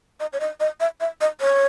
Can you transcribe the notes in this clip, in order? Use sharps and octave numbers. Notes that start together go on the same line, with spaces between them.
D#5
C#5
D#5
D#5
E5
E5
D#5
C#5